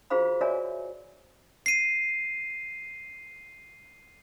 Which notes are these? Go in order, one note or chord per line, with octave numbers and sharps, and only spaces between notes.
F4 F#4 G#4 C5 F5 B5
F#4 A#4 C#5 D5 E5 G#5
C7 D#7